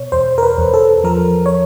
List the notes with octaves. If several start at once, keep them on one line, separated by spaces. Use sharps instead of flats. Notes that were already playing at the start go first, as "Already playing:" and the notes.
Already playing: B2 C#5
E2 C5
A#4
B4
E2
A4
F3 A#4
C#5